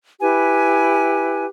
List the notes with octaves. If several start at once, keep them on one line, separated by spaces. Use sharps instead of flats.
E4 G4 B4 G#5